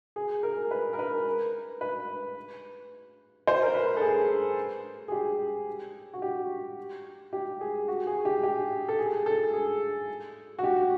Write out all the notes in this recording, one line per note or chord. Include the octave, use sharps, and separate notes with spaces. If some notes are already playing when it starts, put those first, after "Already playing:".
G#4
A#4
B4
A#4
B4
B4
C5
A#4
B4
A4
G#4
G#4
G4
F#4
G4
G4
G#4
F#4
G#4
G4
G4
A4
G#4
A4
G#4
F#4
G4